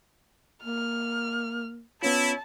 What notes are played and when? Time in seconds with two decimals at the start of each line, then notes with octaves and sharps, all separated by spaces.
0.64 A#3 F6
2.03 B3 C#4 E4 F4 C#5 A5